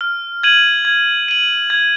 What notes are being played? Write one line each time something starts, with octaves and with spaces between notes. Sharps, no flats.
F6
G#6 D#7 F#7
G#6
D#7 F#7
G#6